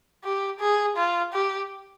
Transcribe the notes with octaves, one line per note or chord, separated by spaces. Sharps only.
G4
G#4
F4
G4